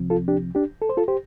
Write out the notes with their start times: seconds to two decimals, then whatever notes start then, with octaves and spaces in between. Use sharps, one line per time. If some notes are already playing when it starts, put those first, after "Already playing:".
Already playing: C2 C3 F3 C4
0.10 F4 A4
0.28 D4 G4
0.55 D4 G4
0.82 A4
0.89 C5
0.97 F4 A4
1.08 G4 C5